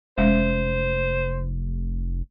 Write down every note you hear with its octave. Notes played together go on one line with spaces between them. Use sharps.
F1 G#3 C#4 C5 E5